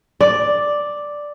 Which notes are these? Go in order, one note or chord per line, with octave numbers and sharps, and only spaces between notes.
D5